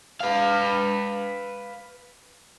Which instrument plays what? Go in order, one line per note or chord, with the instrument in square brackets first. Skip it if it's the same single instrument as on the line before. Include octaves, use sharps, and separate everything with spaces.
[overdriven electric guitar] B4 F5